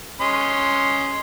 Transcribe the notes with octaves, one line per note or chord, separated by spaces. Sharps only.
C#4 D#5 C6